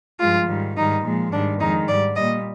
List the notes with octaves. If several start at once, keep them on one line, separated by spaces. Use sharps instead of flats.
G2 F3 G#3 F4
G#2 D#3 G3
G#2 D#3 G3 D#4
A#2 F3 G#3
G#2 D#3 G3 D4
F2 D#3 G#3 D#4
G#2 G3 D5
A#2 G3 D#5